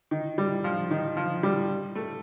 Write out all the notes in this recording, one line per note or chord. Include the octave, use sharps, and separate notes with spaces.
D#3
G3
F3
D#3
F3
G3
A3